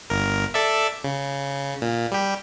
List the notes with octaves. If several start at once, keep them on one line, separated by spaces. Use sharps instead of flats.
G1 A#4
A4 D5 E5
C#3
A#2
G3 G4